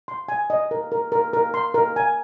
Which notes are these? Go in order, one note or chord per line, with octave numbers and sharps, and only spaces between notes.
C6
G#5
D#5
A#4
A#4
A#4
A#4
C6
A#4
G#5